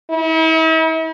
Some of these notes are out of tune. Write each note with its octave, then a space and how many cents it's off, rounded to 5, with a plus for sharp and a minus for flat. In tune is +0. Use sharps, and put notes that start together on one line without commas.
E4 -45